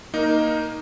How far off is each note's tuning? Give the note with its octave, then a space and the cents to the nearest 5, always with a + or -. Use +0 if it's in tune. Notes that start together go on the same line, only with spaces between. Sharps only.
A#3 +0 D#4 +0 A#4 +25